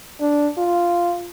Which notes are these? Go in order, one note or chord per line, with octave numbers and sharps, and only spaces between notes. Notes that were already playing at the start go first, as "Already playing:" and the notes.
D4
F4